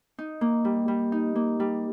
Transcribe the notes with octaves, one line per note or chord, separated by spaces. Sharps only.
D#4
A#3
G3
G3
D#4
A#3
G3